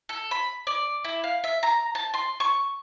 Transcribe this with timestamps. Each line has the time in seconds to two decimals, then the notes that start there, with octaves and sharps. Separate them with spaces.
0.09 A4
0.31 B5
0.67 D5
1.04 E4
1.24 F5
1.44 E5
1.63 A#5
1.95 A5
2.14 C6
2.40 C#6